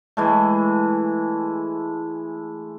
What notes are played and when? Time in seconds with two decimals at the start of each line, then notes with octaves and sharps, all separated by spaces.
0.17 E3 G#3 A3